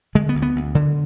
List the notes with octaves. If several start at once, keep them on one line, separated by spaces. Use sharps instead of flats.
D3 G#3
B3
D2
B3
D2
D3